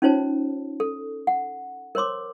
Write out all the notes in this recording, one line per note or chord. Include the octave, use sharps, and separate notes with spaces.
C#4 D#4 F4 C5 C#5 A5
A4
F#5
A#4 C5 C#5 C6 D6